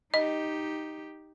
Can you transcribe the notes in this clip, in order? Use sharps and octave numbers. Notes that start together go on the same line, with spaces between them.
D#4 G4 D#5